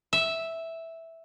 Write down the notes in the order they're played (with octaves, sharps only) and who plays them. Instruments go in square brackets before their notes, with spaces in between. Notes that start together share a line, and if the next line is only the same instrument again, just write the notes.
[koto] E5